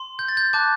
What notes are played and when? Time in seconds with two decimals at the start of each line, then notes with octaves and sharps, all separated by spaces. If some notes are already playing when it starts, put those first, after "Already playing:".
Already playing: C6
0.19 G6
0.28 A6
0.37 G6
0.53 A5 D6 F#6 G6